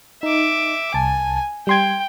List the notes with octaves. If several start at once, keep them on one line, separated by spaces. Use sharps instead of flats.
D#4 E5 D6
C2 G#5 A5
G3 G5 C6 G#6